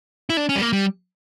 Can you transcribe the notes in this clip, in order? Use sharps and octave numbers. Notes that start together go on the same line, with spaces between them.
E4
D4
C#4
G3
A#3
G3